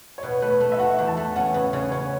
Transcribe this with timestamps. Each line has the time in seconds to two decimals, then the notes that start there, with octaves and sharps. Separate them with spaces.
0.18 C#5
0.23 B2 B4
0.42 A3 B4
0.61 A3
0.72 E5
0.79 F#4 F#5
0.99 E2
1.08 A5
1.17 A3
1.36 C#4 F#5
1.54 C#3 B4
1.73 C#3 C#5
1.92 C#4 C#5